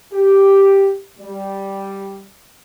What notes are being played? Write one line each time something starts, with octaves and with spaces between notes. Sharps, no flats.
G4
G3